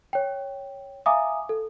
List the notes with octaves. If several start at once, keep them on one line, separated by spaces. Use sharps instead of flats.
C#5 G5
E5 F5 G#5 A#5 D6 D#6
A4